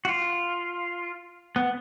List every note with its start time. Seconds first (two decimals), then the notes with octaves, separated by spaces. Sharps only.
0.05 F#4
0.09 F4
1.56 B3